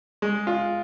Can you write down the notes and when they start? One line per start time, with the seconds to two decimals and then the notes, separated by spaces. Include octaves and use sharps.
0.22 G#3
0.47 F4